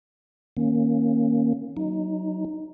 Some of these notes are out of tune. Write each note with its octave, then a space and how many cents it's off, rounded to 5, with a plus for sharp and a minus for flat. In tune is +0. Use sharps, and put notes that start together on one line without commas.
D#3 +0 A#3 +0 C#4 -15
F#3 +5 D#4 +0